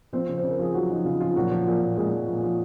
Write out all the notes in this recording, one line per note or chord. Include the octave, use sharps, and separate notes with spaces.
F3 C4 C5
C#3
C5
C#3
A#4
F3 G#4
F3 F#3 F#4
F3 D#4
C#3 F4
F3 F4
A#2 F#3 F#4
F3
A#2
A#2
A#2 G#3 G#4
F3
A#2
F3